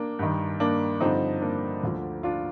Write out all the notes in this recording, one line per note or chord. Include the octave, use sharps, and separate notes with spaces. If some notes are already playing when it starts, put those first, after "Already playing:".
Already playing: A#3 D4
G2 D#3
A#3 D4
G2 D3 F3 C4 D#4
A#3 D4
D2 D3 F3
D4 F4